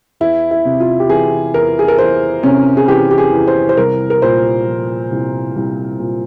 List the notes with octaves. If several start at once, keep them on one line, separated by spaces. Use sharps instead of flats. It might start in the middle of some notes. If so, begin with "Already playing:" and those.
E2 E4
E4
C3
F4
G4
E3 G#4
E2 A#4
G#4
A#4
E2 C5
C3 C#4
G#4
E3 G4
G4
G#4
E2
C5
C5
C2 A#4
A#4
A#2 C5
F3
C2
C2
A#2